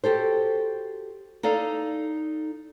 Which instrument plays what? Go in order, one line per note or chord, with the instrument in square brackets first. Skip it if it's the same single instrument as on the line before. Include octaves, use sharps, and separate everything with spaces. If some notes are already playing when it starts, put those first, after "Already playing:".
[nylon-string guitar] F#4 G4 A4 C5
D#4 A4 D5 F5